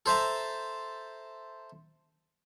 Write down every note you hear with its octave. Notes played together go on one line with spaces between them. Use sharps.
A4 C5 E5 A5 A#5